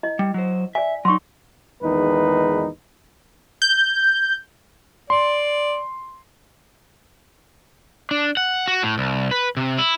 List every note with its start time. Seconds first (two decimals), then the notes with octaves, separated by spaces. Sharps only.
0.03 E4 D#5
0.19 G3
0.34 F#3 C5
0.75 D5 E5 G#5
1.05 F#3 D#4 C6 C#6
1.82 A#1 E2 D#3 G#3 D#4 B4
3.62 G6
5.10 D5 C6
8.11 D4
8.37 F#5
8.68 F#4
8.82 A2
8.98 C2
9.31 B4
9.57 C3
9.79 E4